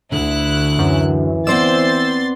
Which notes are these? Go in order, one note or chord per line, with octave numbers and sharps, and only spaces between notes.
D2 D3 E4 F#6
F#2 E3
B3 C4 C5 D5 C6 E6 A6